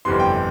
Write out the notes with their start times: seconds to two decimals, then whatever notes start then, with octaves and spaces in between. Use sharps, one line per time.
0.05 G1 F2 C3 E3 C6
0.20 G5